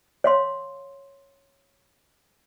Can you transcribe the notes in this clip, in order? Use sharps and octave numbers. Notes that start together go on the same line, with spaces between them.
C#5 F5 C6